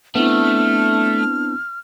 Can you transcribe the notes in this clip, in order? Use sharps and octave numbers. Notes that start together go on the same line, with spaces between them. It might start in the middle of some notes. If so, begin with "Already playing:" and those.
A3 B3 C4 D4 E4 F6